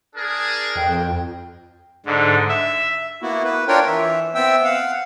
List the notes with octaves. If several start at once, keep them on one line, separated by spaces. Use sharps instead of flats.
D4 G#4 A#4 A6
F2 G5
G#2 D3
E5
A#3 B3 E4 F#4
B4
D4 F4 A#4 C#5 G5
E3 E5
B3 C4 E5 G5 E6
F5 F#5